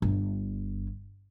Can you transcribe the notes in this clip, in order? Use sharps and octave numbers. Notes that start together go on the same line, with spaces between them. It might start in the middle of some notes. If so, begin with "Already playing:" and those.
G1